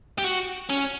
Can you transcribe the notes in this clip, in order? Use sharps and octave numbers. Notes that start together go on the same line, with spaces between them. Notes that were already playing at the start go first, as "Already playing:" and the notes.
G4
F#4
C#4